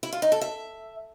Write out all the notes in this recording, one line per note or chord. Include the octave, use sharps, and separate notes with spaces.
E4
F4
D#4
A4
E5